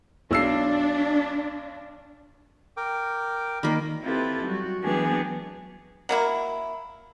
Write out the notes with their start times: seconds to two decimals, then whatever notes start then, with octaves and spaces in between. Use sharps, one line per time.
0.31 B1 D4 E6 C7
2.77 A#4 G5 D6
3.63 D#3 A#3 D5 B5
4.02 C4 E4 F4 G4 A4 B4
4.44 F#3 G3 F#4
4.81 E3 F#3 B3 D4 G4 G#4
6.09 F#3 A#3 E4